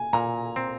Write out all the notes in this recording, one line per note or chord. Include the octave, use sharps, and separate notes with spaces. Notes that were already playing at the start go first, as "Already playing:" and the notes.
Already playing: G#5
A#2 A#5
C4